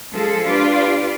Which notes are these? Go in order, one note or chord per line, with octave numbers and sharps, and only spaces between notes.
F3 G#3 G#4 A4
D4 F4 G4 B4 D5